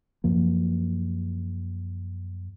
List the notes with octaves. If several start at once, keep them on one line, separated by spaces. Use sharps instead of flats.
F#2 F3 A#3